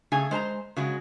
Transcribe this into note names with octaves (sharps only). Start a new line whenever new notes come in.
C#3 A3 G#4 G#5
G#3 C5 A5 A#5
C#3 F#3 G#3